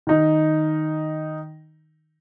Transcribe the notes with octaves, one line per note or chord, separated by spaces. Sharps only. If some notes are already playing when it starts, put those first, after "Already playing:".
D#3 D#4